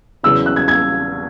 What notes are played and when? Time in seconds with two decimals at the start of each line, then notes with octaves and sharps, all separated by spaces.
0.23 E2 C#3 F#3 B3 E6
0.46 F#6
0.56 G#6
0.68 G#6